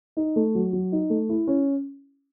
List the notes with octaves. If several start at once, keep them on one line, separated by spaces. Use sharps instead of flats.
D#4
A3
F#3
F#3
D#4
A3
E4
C#4